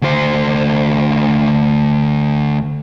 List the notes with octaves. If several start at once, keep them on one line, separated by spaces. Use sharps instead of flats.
D2 C5